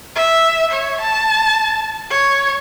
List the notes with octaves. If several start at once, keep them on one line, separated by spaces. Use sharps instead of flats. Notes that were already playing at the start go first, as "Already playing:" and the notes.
E5
C#5
A5
C#5